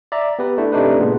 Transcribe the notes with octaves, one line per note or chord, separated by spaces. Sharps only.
D5 E5 A#5
B3 G4 B4
A3 D4 E4
C3 A3 D4 D#4 G4 B4
A#2 C#3 G#3 B3